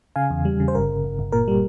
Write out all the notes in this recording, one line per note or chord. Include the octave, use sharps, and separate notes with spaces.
C#3 F5 G#5
E2
G3
C#3
C5
G1 A#4
G1
G1
G1
A#2 A#4
G3